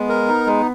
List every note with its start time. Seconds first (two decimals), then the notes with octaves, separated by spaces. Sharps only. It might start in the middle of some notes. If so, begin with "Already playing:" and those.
Already playing: G#3 B3
0.09 A#4
0.28 D#4
0.46 G#3